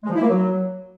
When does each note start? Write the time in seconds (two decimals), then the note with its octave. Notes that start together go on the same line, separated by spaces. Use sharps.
0.04 G#3
0.10 F3
0.16 E4
0.22 A#3
0.28 F#3